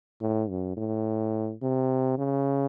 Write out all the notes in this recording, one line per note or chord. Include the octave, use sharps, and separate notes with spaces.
A2
F#2
A2
C3
C#3